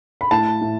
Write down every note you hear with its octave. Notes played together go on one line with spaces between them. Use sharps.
B5
A2 A5
A2